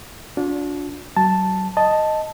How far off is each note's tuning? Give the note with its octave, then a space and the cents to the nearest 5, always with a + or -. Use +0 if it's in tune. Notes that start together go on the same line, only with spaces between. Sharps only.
D4 -25 F4 +45
F#3 +35 A5 +0
D#5 +0 A5 +0